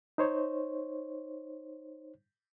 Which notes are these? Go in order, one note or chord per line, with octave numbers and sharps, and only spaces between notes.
D#4 C5 C#5